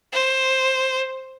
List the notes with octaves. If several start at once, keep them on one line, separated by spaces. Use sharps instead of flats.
C5